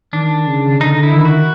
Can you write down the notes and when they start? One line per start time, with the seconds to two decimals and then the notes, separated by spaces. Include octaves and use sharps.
0.13 D#3 D4
0.46 C#3
0.80 D3 D#4
1.03 E4
1.14 D#3
1.25 F#4